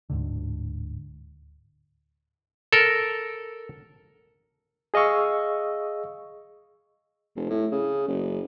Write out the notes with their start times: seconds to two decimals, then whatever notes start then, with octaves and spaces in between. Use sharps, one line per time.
0.10 D1 D2 G#2 D3
2.73 A4 A#4
4.94 G#4 D#5 F5 C#6 E6
7.36 F1
7.50 A2
7.72 C#3
8.08 F#1